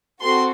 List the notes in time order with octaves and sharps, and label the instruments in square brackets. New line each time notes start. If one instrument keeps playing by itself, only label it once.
[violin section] C4 F#4 A4 C6